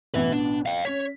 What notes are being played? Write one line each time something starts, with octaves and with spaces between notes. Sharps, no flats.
A1 B2 B3 E4 B4
D4
F5 G5
C#4 C#5 B6